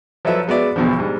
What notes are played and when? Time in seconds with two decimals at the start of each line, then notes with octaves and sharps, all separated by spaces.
0.25 F3 F#3 E4 A4 B4 E5
0.48 G#3 B3 F#4 D5 E5
0.76 B1 E2 B2 D3 F3
0.99 G#2 G3